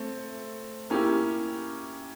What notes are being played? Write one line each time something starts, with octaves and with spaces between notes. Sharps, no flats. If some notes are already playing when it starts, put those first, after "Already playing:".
Already playing: A3 C4
A#3 C#4 E4 G4